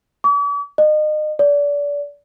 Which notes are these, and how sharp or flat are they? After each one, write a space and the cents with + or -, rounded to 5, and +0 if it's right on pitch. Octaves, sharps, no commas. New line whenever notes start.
D6 -45
D#5 -35
D5 -30